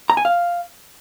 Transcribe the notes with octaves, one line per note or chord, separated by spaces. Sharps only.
A#5
G#5
F5